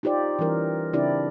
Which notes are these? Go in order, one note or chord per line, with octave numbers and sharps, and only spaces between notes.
D#4 F4 G4 C5 D5
E3 G3 C#4 A#4
C#3 C4 D4 E4 G4 D5